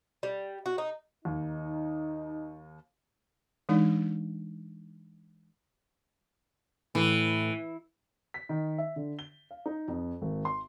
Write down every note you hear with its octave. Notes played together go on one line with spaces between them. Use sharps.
G3
F#4
D#4
D#2 D#4
E3 G#3 D4 D#4
A2 E3
B6
D#3
E5
D3
G7
F5
D#4
F2
G#1
C6